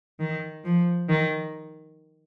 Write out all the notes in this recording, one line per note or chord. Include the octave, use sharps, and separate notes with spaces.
D#3
F3
D#3